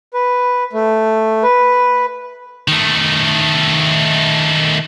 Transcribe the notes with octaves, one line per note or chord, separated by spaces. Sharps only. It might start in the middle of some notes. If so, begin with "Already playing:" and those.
B4
A3
B4
D#3 A3